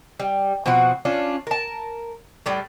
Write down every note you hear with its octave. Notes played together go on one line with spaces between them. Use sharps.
G3
B2 F3 C4 F#4
C#4 D4 F4
A#4 A5
A2 G3 D4